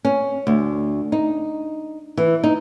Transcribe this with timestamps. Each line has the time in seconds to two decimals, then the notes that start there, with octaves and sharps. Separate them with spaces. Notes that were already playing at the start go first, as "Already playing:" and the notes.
0.05 C#4
0.47 D2
1.12 D#4
2.17 E3
2.44 D#4